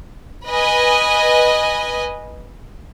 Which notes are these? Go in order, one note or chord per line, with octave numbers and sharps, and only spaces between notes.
B4 D#5 G#5